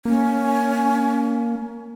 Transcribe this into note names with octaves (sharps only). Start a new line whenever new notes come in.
A#3 C#4